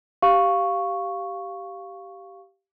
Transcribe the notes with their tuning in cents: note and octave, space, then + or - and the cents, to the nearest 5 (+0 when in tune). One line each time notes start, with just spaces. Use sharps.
G4 -10 F5 +0 C#6 +0